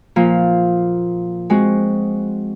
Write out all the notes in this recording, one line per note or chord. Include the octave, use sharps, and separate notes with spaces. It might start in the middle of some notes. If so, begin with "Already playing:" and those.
A#2 F3 A#3
G#3 C4 F#4